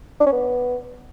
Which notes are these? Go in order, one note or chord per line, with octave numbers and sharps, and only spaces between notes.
D4
C#4
B3